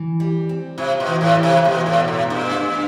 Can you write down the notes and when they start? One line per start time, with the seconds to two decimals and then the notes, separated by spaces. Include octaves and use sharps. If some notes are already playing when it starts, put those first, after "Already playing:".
Already playing: E3
0.20 G3
0.49 C4
0.78 C3 F4
1.00 B2
1.07 E3
1.21 A2
1.36 G3
1.43 C3
1.64 E2 B2
1.86 A2
1.93 B2
2.08 A2
2.22 A3
2.30 G2
2.51 D4